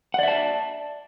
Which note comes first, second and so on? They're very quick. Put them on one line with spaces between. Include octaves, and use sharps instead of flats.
F#5 D5 E5 A5